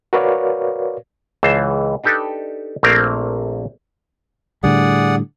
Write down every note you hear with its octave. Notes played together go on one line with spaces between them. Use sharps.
F#4 A#4 B4 C#5 D5 F5
C#2 E3 C5 A5
D4 D#4 G4 A4 B4
A#1 A3 A#3 C4 A#4
A2 D3 G3 G#4 D5 F#5